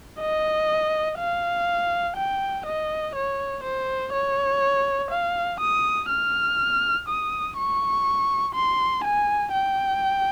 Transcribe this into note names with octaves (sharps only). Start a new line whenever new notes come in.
D#5
F5
G5
D#5
C#5
C5
C#5
F5
D#6
F6
D#6
C#6
C6
G#5
G5